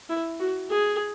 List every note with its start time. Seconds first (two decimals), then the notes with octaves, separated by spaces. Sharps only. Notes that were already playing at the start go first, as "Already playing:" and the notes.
0.09 E4
0.39 F#4
0.71 G#4